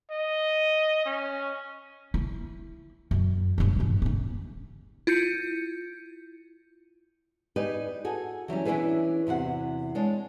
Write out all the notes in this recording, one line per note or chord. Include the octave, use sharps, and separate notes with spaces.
D#5
C#4
E4
F#2
G2 C#3
G#1 E3
C#4 D#4
E4 F4 G6 C#7
D#4 G4 G#4 B4 D5
F#4 G#4 A4
E3 F#3 G3 C#4
E3 C#4 D4 E4 G#4 B4
E2 C3 F#4 F#5
G#3 D4 C#5